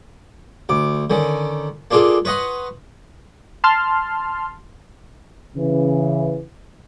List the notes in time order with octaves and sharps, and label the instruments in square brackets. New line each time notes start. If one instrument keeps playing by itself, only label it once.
[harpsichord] D2 D6
D3 D#3 C#4
A#3 D4 F4 G#4 A4
B4 C#5 D#5 F#5 C6
[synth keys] A5 C6 F6
[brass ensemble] C#3 E3